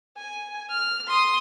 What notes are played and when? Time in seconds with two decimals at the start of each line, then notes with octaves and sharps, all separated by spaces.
0.17 G#5
0.71 F6
1.08 C6 D#6